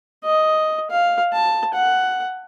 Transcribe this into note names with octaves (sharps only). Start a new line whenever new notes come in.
D#5
F5
A5
F#5